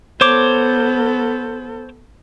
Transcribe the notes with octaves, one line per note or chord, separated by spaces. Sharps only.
B3 A4 C5 C#5 D6